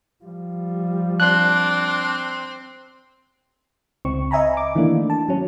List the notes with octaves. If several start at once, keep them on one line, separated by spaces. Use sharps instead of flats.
F3 G3
C4 D4 F#6
C#2 C4 C#6
D#5 E5 G#5 A#5 B5
D6
D#3 E3 A3 A#3 D4
A5
F#3 C#4